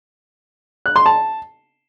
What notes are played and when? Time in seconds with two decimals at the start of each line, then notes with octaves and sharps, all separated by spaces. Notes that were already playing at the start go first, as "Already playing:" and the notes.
0.86 F#6
0.96 C6
1.06 A5